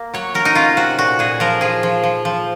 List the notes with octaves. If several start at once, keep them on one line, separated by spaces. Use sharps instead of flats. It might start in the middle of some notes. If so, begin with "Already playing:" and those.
Already playing: A#3
F#3 C#5
F#3 A#4
D#4
C#4 F4
C3 F#4
A#2 F#4
A#2 G#4
F3 A#4
F3 G#4
F3
F3
F3